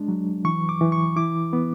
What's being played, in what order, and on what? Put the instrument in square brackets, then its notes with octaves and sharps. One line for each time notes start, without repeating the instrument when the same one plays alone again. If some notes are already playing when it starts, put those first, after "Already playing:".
Already playing: [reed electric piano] G#3 D4
F#3
E3 C#6
D6
E3
C#6
E4 D6
B3